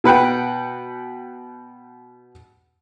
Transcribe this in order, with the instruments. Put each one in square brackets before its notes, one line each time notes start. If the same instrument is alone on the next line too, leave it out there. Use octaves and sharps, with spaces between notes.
[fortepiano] B2 B4 F#5 G5